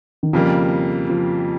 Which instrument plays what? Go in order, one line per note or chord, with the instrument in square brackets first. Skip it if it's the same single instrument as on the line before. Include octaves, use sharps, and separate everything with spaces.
[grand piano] D#3
[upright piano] F2 C#3 G3 A#3 [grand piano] F3
[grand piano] F3